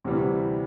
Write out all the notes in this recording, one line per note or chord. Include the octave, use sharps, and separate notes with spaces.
D2 C3 E3 G3